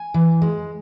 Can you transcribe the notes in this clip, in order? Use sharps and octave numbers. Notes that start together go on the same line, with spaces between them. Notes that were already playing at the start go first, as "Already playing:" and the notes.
Already playing: G#5
E3
G#3